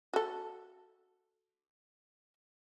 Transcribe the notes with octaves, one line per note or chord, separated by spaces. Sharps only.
F#4 A4